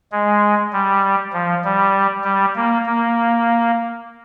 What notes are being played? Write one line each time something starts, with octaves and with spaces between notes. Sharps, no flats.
G#3
G3
F3
G3
G3
A#3
A#3